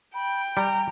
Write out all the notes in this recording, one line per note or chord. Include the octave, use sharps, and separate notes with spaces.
G5 B5
G3 A#5